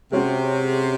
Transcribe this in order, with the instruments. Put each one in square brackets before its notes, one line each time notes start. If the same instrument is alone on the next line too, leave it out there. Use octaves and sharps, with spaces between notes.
[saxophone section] C3 [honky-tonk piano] G#3 C#4 F#4